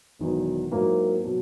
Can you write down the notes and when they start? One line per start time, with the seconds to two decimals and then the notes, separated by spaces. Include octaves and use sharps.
0.19 E1 E2 D#3 F#3
0.71 G#2 F#3 A#3 E4 A#4
1.24 B2 F#3